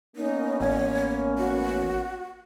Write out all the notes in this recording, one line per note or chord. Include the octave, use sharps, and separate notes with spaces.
A#3 B3 C#4 D#4
A1 C#5
F#4